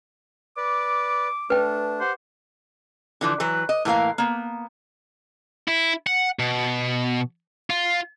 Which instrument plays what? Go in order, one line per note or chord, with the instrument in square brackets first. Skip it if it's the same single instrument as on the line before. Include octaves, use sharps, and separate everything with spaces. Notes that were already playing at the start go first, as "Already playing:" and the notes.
[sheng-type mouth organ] B4 D5 [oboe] D6
[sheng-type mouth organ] A3 D4 [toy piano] B4 G5
[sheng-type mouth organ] G4 F#5 [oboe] C5
[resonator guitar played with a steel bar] D3 E3 F3
E3 F#3 B4
D#5
A2 E3 A#3 F5
A#3 B3
[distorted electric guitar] E4
F#5
B2
F4